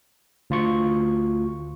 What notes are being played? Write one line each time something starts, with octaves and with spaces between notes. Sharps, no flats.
D2 F4 C#6